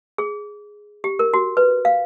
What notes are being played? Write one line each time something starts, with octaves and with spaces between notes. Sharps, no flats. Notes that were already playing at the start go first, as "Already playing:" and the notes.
G#4
G4
A#4
F#4
B4
F5